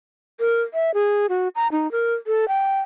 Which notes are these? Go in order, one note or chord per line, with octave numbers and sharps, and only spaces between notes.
A#4
E5
G#4
F#4
A#5
D#4
A#4
A4
G5